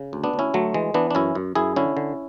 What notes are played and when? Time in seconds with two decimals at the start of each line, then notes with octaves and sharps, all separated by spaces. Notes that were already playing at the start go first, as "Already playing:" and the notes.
Already playing: C#3
0.13 D2
0.24 B3 D4
0.34 D2
0.39 C#4 E4
0.54 D2 F#3 A3
0.74 E3 G#3
0.94 E3 B3 D4
1.11 D4
1.15 F#2 C#4 E4
1.35 F#2
1.55 F#2 E4 G#4
1.76 D3 C#4 E4
1.97 D3